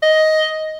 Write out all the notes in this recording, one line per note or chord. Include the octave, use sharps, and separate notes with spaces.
D#5